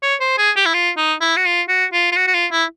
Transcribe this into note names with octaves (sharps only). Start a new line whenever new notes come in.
C#5
C5
G#4
G4
E4
F4
D#4
E4
F#4
F4
F#4
F4
F4
F#4
F#4
F4
E4